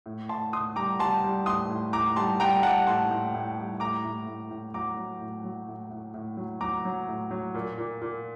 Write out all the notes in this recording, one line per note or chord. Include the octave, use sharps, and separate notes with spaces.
A2
A2 A5 C6
A2 C6 D#6
G3 A#5 D6
G3 A5 C6
G3
A2 C6 D#6
A2
A2 A#5 D6
G3 A5 C6
G3 G5 A#5
G3 F#5 A5
A2 A5 C6
A2
A2
G3
A2 A#5 D6
A2
A2
A2
F#3 A#5 D6
F#3
A2
F#3
A2
A2
A2
F#3
F#3 A#5 D6
F#3
A2
F#3
A#2
A#2
A#2